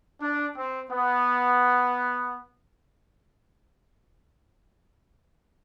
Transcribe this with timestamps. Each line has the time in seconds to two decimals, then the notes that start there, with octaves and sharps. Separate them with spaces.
0.22 D4
0.57 C4
0.92 B3